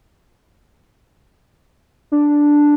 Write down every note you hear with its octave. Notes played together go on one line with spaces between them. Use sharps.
D4